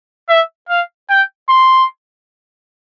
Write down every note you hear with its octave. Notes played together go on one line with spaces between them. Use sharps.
E5
F5
G5
C6